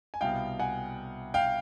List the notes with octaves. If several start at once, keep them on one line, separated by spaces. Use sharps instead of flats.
G#5
C2 B2 F5 G5
F#5 G#5
F5 G5